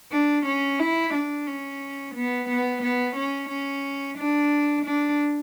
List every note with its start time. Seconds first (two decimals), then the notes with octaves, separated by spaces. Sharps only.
0.12 D4
0.46 C#4
0.80 E4
1.14 D4
1.47 C#4
2.15 B3
2.49 B3
2.82 B3
3.16 C#4
3.49 C#4
4.18 D4
4.85 D4